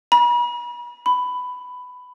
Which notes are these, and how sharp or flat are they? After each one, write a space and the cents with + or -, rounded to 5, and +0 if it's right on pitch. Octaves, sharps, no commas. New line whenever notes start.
B5 -45
B5 +10